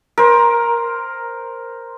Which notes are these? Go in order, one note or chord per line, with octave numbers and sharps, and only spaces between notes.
A#4 C5